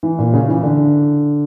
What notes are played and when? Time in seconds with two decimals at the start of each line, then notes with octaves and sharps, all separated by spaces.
0.03 E3
0.19 A#2
0.33 C#3
0.48 E3
0.63 D3